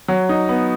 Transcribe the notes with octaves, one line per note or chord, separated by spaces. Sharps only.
F#3
D#4
B3